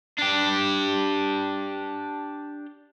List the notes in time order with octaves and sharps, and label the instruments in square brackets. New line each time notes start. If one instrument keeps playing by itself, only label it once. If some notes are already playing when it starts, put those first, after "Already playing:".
[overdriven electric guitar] D4 G4